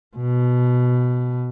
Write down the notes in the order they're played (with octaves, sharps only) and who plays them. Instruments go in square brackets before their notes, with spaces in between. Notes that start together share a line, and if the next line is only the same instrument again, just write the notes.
[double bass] B2